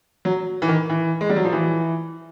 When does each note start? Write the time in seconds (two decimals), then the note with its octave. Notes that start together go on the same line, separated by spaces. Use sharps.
0.25 F#3
0.62 E3
0.68 D#3
0.90 E3
1.21 G#3
1.30 G3
1.36 F#3
1.45 F3
1.52 E3